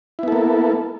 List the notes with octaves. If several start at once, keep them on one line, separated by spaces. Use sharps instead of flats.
A#3 B3 E4 A4